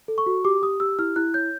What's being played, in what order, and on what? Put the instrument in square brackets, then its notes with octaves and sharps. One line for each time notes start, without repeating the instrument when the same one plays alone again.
[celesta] A4
C#6
F#4
G4 D6
G4 D#6
G4 E6
E4 F6
E4 F#6
C#5 G6